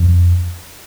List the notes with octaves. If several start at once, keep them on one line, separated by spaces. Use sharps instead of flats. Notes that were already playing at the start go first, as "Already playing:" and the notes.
Already playing: F2